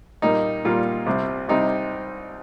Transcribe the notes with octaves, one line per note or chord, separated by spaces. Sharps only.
A#2 G3 A#3 D#4
A#2 G3 A#3 F4
C2 C3 G3 C4
C2 C3 G3 C4 D#4